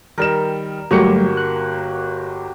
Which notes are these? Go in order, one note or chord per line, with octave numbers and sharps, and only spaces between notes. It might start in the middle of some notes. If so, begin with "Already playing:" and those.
D#3 G3 A#4 E7
G1 F#3 G3 A3 A#3 F#4 G4 C#7
F#6